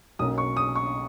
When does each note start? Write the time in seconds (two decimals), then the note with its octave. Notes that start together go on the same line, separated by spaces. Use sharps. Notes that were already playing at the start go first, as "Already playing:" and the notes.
0.19 B1 B2 A#3 C#4 D#6
0.38 C#6
0.57 D#6
0.75 C#6